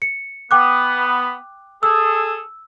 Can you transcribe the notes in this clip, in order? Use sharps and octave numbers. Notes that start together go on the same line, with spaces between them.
C#7
B3 G5 D6 F#6
G#4 A4 E6